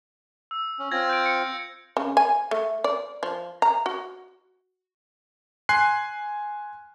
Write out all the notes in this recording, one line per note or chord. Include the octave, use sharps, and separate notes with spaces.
E6
C#4
C4 F4 G#6 A#6
G6 D7
C#7
C#3
G#5
A3
D5
F3
A#5
F#4
G#5 C6 F#6 C7